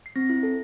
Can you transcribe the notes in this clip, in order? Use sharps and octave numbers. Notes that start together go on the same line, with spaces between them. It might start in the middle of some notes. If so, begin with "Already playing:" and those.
C7
C4 A#6
E4
A4